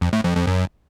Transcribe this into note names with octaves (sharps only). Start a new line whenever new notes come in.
F2
A2
F2
F2
F#2